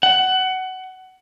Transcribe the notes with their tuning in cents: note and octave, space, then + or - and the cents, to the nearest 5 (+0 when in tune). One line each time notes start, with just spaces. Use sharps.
F#5 +20